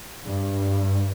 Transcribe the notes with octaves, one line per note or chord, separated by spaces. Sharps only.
G2